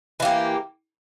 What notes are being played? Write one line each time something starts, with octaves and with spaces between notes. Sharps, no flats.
E3 A#3 G4